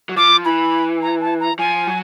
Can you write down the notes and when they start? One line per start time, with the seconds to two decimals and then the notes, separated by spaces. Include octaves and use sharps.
0.09 F#3
0.17 F3 D6
0.45 E3 B5
1.02 A#5
1.21 A5
1.40 A#5
1.59 F3 G#5
1.87 F#3